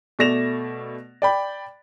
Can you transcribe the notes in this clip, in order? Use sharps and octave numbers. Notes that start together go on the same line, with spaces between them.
B2 A3 D5 A#6 E7 F7
D5 G5 B5